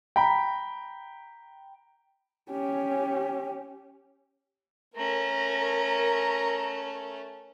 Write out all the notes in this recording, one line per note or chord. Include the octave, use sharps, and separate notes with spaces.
G5 A#5 B5
C#4 G4
A3 C#4 A#4 A#5